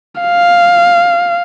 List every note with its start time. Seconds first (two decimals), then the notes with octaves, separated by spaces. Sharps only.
0.21 F5